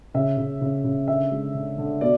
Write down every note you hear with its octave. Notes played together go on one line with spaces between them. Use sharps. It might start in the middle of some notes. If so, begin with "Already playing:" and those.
C#3 E5
C#3
C#3
C#3
D3 E5
G#3
D3
D3
B2 D5